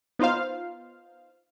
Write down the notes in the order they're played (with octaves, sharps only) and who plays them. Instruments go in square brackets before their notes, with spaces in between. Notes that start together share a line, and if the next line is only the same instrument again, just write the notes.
[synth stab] B3 D#4 F4 C5 F5